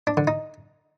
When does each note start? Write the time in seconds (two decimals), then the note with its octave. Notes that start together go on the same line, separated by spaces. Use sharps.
0.07 D4
0.17 D3
0.27 D#4